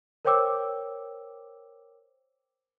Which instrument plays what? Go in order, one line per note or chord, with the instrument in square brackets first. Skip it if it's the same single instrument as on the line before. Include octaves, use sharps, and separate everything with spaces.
[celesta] A#4 C5 C#5 G5 D6 E6